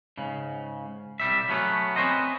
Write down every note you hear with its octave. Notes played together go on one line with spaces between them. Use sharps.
G#2 C#3
C2 G3 E5
F#3 A3 B3 C#4
C4 C#4 B4 C5 D#5